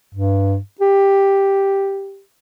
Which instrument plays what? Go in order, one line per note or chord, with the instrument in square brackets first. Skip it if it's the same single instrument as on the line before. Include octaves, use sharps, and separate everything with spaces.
[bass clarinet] G2
G4